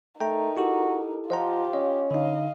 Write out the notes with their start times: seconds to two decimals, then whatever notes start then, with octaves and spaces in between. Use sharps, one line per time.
0.20 A3 D#4 A#4 G5 A#5
0.57 E4 F#4 G4 A4
1.30 F3 F4 G4 D#5 F#5 A#5
1.74 C#4 D#5
2.11 D3 D#4 D#5 F5